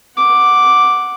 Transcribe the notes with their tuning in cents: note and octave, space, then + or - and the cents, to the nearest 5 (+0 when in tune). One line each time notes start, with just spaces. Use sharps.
F#5 +0 D6 +0